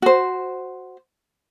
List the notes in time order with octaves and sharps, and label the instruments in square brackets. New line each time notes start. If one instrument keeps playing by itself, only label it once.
[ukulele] F#4 C5